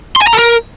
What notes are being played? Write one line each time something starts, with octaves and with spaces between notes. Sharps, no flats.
C6
G#5
A#5
A4
A#4